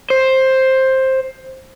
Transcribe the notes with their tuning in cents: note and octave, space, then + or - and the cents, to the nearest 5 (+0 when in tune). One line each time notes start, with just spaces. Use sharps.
C5 +10